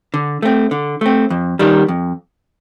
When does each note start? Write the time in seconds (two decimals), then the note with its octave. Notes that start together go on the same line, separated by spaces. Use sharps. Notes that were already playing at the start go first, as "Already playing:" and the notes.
0.14 D3
0.42 A3 C4
0.71 D3
1.01 A3 C4
1.30 F2
1.59 D#3 G3 D4
1.88 F2